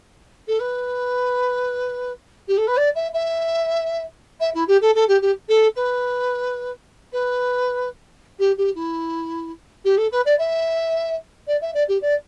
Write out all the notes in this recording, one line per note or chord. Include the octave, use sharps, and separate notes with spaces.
A4
B4
G4
A4
B4
D5
E5
E5
E5
E4
G4
A4
A4
G4
G4
A4
B4
B4
G4
G4
E4
G4
A4
B4
D5
E5
D5
E5
D5
G4
D5